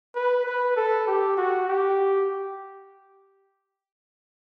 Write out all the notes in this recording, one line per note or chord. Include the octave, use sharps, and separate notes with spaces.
B4
B4
A4
G4
F#4
G4